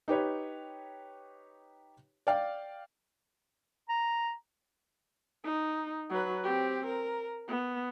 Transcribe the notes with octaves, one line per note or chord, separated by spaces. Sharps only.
D#4 G4 B4 C#5
D5 F5 G5
A#5
D#4
F#3 B4
C4 G4
A#4
B3